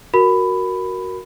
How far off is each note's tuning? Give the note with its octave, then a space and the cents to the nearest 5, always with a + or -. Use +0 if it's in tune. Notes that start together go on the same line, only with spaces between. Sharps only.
F#4 +0 A#4 +0 B5 +15